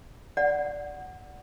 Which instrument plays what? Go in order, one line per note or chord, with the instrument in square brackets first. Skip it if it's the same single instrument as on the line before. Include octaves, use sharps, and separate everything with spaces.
[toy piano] D5 F#5